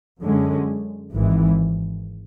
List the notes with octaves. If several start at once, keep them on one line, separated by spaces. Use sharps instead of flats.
F#2 D3 G#3 C#4
G#1 G#2 E3